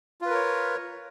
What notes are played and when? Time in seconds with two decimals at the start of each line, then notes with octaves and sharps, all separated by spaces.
0.21 F4
0.26 B4
0.30 A#4
0.34 C#5